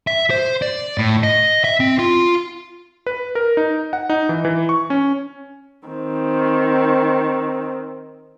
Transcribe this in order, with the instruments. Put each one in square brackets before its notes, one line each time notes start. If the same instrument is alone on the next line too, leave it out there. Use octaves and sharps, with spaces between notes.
[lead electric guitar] E5
C5
D5
A2
D#5
E5
C4
F4
[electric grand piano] B4
A#4
D#4
F#5
D#4
E3
E3
C#6
C#4
[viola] D#3 C4